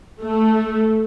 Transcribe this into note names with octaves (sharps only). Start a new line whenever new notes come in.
A3